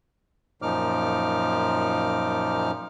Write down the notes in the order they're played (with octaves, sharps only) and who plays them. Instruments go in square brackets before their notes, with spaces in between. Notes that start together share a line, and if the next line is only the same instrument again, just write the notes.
[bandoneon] F#2 A#2 F3 D#4 D6 F6